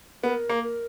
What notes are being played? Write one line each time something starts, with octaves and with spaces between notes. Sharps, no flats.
B3 A#4
A#3
A#4